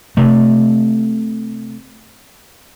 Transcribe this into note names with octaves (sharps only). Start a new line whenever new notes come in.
C3 A3